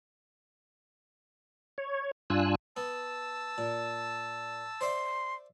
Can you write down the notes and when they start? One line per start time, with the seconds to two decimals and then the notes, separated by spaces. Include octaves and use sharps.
1.78 C#5
2.30 G2 D4 F4 G#5 E6 F#6
2.77 B3 A5 E6
3.58 A#2
4.81 C5 D5 E5 C6